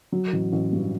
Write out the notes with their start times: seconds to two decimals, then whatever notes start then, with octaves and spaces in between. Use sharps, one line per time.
0.12 F#3
0.32 A1
0.53 A1
0.73 G2